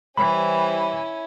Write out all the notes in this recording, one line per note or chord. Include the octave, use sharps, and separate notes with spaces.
E3 G3 C#4 E4 G4 C5 B5